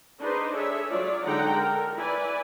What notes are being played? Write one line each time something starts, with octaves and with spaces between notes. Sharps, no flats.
D4 D#4 G#4 B4 C5
G#4 A4 C#5 E5
F#3 F4 C#5 D5
D3 G#3 D#4 F#5 G5 A#5
A4 A#4
E4 B4 D5 G#5